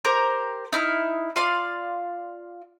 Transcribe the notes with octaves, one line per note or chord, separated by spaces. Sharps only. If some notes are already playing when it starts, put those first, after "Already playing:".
G4 A#4 C5 A#5
D#4 E4 F6
F4 D5 F5 C6